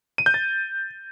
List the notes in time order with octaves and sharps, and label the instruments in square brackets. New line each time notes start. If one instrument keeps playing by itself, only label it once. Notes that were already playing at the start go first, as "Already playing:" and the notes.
[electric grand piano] D#7
G6
A6